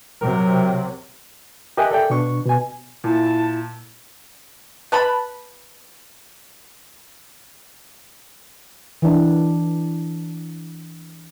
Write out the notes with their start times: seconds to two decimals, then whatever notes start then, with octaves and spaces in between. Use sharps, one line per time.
0.21 C3 F#3 A#4
1.77 G4 A#4 D#5 E5 G#5 F#6
1.91 A4 D5 E5 G5
2.10 B2 D4 C#6
2.46 B2 G#5
3.04 A#2 E4 A5
4.92 B4 A5 B5
9.02 E3 D4